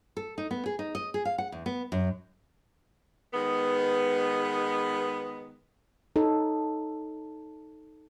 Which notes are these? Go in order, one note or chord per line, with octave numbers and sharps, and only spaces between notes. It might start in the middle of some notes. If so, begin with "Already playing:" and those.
A4
D#4
B3
G#4
D#4
D#5
G#4
F5
F#5
E2
B3
F#2
D#3 G#3 B3
D#4 A4 C#5